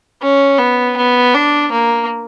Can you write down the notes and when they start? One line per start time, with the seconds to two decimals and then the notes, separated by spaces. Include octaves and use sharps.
0.22 C#4
0.58 B3
0.97 B3
1.34 D4
1.72 A#3